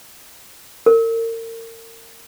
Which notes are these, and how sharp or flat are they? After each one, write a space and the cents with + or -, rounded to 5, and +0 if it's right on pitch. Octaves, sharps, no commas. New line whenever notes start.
A#4 -35